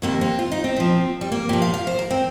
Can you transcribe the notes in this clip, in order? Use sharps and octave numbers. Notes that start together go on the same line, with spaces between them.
F2 C3 D#3 A#3
C4
F4
D#4
C4
A#2 F3
G3
A#3
A#2 F3 G4
F5
F5
C5
A#4
C4